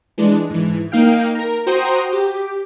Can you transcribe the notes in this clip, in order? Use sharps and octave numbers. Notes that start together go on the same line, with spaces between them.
E3 G#3 D4
G#2 E3
A#3 D#4 F5 G5
A#4 A#5
F#4 C5 G5 A#5 C6 D#6
G4